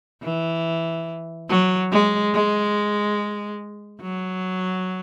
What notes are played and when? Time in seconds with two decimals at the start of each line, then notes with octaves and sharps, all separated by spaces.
0.22 E3
1.49 F#3
1.92 G#3
2.33 G#3
4.01 F#3